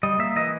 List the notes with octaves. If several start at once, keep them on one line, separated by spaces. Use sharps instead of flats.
G3 D#5
A#3 E5
E3 D#5